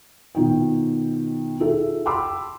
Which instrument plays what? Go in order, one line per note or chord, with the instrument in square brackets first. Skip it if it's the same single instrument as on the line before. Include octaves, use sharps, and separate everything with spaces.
[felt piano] B2 D#3 F4 G5
D#4 F4 G#4 A4 E5
G5 A5 B5 C6 D6 E6